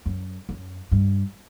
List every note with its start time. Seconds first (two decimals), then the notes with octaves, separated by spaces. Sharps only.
0.06 F#2
0.49 F#2
0.92 G2